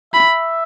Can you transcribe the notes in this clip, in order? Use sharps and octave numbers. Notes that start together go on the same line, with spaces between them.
E5 B5